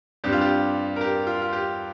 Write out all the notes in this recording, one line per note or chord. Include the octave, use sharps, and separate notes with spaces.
G2 G3 C4 G4
F4
G4
A#4
G4
F4
F4
G4